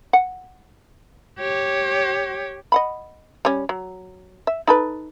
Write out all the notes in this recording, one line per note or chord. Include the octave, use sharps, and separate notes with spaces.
F#5
G4 C#5
D#5 F#5 B5
G3 C#4
F#3
E5
D#4 A4 B4